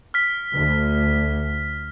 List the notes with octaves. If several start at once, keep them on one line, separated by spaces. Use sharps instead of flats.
F6 B6
D2